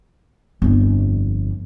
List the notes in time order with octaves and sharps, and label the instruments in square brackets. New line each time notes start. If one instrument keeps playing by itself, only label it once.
[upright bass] G1 F2